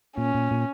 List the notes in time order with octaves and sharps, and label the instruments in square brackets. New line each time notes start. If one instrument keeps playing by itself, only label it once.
[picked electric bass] A#2 [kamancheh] C#4
[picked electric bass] A#2
A#2